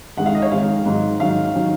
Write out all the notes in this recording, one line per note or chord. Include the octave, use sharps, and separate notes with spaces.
F2 D#3 G#3 F#5
F5
D#5
C#5
F2 D#3 G#3 F5
G#2 D#3 F#3
G#2 D#3 F#3 F5
D#3 F#3